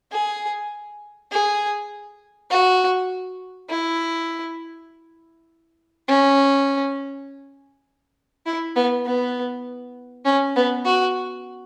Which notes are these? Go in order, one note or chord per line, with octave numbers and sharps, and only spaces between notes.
G#4
G#4
F#4
E4
C#4
E4
B3
B3
C#4
B3
F#4